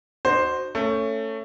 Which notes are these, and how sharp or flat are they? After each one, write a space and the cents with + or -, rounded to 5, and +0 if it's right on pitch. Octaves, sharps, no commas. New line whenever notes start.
D#4 -45 F#4 +0 C5 +0
A3 +20 C#4 +0